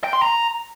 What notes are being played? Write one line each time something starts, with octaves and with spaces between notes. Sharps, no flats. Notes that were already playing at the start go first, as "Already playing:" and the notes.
G5
C6
A#5